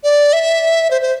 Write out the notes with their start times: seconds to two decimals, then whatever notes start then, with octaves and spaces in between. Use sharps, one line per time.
0.04 D5
0.33 E5
0.91 C5
1.02 C5